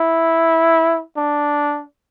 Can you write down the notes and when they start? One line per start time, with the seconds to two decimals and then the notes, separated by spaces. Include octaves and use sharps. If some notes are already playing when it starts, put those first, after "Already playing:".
Already playing: E4
1.17 D4